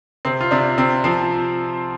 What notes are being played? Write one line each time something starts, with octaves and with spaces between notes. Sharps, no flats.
C3 C4
F4
C3 D4
C3 C4
F3 C4